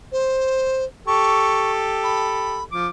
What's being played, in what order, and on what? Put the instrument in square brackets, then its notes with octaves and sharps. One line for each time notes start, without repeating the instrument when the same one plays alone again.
[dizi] C5
[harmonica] G4 A4 [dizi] C#6
[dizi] B5
[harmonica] F3 D6